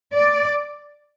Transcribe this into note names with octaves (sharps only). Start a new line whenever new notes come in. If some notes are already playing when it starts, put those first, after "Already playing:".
D5